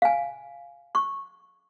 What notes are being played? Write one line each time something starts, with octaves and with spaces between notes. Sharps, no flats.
F5 G#5
C#6